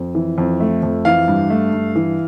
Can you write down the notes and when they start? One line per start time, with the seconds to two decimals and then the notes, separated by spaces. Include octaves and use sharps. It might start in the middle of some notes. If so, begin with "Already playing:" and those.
Already playing: F2
0.15 E3
0.38 F2
0.60 A3
0.83 F2
1.05 E3 F5
1.28 G2
1.50 A3
1.73 G2
1.95 E3